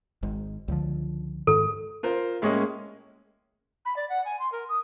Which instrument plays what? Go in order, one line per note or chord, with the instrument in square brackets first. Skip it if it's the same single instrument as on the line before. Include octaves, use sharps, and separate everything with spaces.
[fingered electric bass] G#1 G#2
C#2 D3 F3
[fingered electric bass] G#2 D#3 [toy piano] A4
[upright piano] F4 A#4 C5
A2 G#3 A#3 C#4 D#5
[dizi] B5
D5
F#5
G#5
C6
A#4
D#6